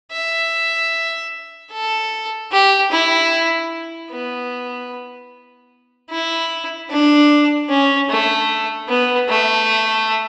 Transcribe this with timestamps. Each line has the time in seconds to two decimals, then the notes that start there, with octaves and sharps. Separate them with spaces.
0.12 E5
1.71 A4
2.52 G4
2.91 E4
4.10 B3
6.10 E4
6.89 D4
7.69 C#4
8.09 A3
8.88 B3
9.28 A3